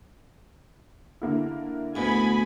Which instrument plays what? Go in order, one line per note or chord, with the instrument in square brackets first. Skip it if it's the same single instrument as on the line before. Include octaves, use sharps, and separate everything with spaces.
[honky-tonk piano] D3 A#3 E4
[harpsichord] D2 B2 [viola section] G#5 B5